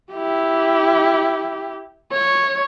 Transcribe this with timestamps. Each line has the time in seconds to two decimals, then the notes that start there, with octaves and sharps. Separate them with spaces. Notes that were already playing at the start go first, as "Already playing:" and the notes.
0.12 E4 G4
2.12 C#5